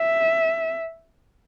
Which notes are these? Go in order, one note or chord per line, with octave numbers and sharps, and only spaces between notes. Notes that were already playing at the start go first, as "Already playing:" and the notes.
Already playing: E5